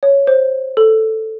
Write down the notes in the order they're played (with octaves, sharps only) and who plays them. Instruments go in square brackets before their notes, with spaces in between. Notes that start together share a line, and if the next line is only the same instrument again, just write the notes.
[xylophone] C#5
C5
A4